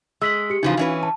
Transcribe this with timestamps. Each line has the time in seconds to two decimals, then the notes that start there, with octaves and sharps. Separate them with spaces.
0.22 G#3 E6 B6 F#7
0.50 G4 C#7
0.63 C#3 E3 F3 D#4 F#4 F5
0.77 E3 C#4 B4
1.03 A5